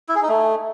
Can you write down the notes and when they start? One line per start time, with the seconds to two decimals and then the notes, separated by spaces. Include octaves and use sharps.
0.09 E4
0.15 G#4
0.22 D#4
0.29 A3